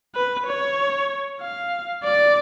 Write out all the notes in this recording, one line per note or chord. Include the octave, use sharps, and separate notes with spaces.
B4
C#5
F5
D5